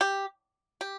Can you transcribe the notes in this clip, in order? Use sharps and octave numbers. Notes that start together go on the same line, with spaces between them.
G4
G4